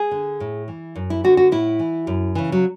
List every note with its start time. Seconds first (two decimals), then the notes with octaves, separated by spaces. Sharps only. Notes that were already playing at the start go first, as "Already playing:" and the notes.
Already playing: G#4
0.11 D3
0.40 A2
0.68 E3
0.95 F#2
1.10 E4
1.24 D3 F#4
1.37 F#4
1.52 A2 E4
1.79 E3
2.07 F#2
2.35 C#3 E3
2.52 F#3